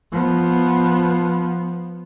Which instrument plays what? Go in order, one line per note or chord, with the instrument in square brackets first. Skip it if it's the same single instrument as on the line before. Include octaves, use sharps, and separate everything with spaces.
[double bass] F3 B3